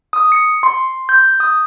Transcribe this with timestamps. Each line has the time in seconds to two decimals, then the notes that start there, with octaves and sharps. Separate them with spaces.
0.13 D#6
0.32 C#7
0.63 C6
1.09 G6
1.40 D#6